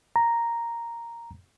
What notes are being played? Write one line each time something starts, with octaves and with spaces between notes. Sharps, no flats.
A#5